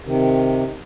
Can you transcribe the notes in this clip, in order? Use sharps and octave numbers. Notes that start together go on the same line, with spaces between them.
C3 D#3